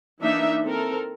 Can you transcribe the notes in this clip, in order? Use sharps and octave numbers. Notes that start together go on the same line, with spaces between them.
E3 A#3 D4 D#4 E5
C4 A4 A#4